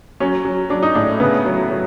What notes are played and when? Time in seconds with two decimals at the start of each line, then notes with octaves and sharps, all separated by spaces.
0.20 F#3 C#4
0.45 F#3
0.70 F#3 D4
0.83 D#4
0.95 A2 D4
1.20 C#3 B3
1.46 F#3
1.71 F#3